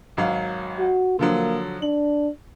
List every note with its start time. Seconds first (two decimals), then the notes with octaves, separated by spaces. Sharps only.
0.17 G#1 F#3 F5
0.80 F#4
1.19 D3 F3 F#3 A#3
1.82 D4 F#7